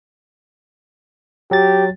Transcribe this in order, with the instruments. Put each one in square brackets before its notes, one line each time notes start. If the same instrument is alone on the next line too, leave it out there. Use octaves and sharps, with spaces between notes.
[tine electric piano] F#3 A6 [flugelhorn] G4